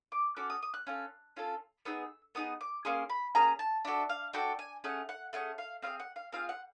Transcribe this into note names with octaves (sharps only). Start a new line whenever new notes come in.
D6
C#4 F#4 A4 D6
D#6
D#6
F#6
C#4 F4 A4
C#4 F4 A4
B3 D#4 G#4 E6
B3 D#4 G#4 D#6
D6
A#3 C#4 G#4 C6
B5
A#3 C#4 G#4 A#5
A5
D4 F#4 A4 E5
F5
D4 F#4 A4 G5
G#5
A3 C#4 G#4 F#5
F#5
A3 C#4 G#4 F#5
F5
C4 F4 G#4 F5
F#5
F5
C4 F4 G#4 F5
F#5